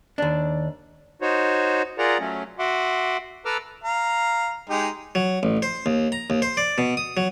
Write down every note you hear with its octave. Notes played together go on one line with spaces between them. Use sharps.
D#2 D4
D#4 F#4 C5 C#5
F4 G#4 A#4 D5 F#5 A#5
F#3 A3 C#4
F#4 E5 F#5 C6 D6
A4 B4 A#5 D6 E6 F6
F5 A#5
G#3 D#4 G4
F#3
A1
C5
D#2
A#5
D#2
C5
D5
B2
D#6
F#3